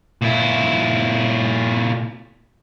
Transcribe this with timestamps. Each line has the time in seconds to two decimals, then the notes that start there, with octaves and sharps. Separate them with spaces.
0.22 A#2 E4